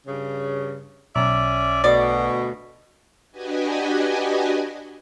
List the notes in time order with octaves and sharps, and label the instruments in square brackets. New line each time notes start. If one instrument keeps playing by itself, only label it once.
[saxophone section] G2 C#3
[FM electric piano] B1 [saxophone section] C#4 D5 E5
[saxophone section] D2 B2 [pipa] D5
[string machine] D4 F#4 G4 B4 D#5 G#5